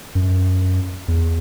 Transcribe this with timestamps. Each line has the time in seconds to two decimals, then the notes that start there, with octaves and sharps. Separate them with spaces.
0.15 F#2
1.08 E2